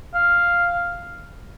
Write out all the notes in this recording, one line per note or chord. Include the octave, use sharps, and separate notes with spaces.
F5